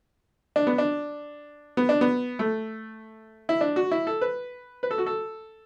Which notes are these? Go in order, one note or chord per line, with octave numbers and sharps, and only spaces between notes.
D4
B3
D4
B3
D4
B3
A3
E4
D4
F#4
E4
A4
B4
B4
A4
F#4
A4